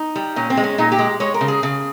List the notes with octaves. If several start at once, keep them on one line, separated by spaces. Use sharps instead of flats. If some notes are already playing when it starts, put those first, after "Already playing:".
Already playing: D#4
G3
A#2 C#4
C4
G#3
C#4
A#2 D#4
G4
G#3
G#3 C#5
A#4
C#3
G#4
C#3